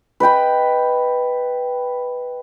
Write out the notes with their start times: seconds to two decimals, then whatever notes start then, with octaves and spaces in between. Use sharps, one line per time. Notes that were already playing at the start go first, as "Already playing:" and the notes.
0.20 B4 D#5 G5 B5